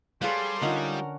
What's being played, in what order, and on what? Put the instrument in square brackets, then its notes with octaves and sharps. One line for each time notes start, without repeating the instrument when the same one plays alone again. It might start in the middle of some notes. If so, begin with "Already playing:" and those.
[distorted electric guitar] G3 [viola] G#4 C6 [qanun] A4 B4 [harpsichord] C#5 F5 A#5
[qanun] D3 C#4 F#5 [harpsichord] D#4 F4 D#5 [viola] A#4